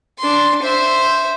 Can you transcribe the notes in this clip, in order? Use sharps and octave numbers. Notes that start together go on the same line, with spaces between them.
D4 C6
C5 E5